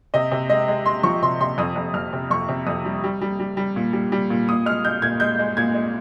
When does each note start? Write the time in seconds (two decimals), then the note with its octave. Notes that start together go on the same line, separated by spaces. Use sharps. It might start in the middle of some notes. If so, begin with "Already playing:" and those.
0.14 C3 D#5
0.32 C3
0.50 G#3 D#5
0.68 G#3
0.85 G#3 C6
1.03 F3 C#6
1.22 C3 C6
1.41 C3 C6
1.58 F2 D#6
1.76 F2
1.94 F2 F6
2.13 C3
2.30 F2 C#6
2.49 C3
2.67 F2 D#6
2.85 G3
3.04 G3
3.22 G3
3.40 G3
3.57 G3
3.76 A#2
3.93 G3
4.12 G3
4.30 A#2
4.49 A#2 D#6
4.66 G#3 F6
4.85 G#3 G6
5.02 A#2 G#6
5.20 G#3 G6
5.39 G#3
5.57 A#2 G#6
5.74 G#3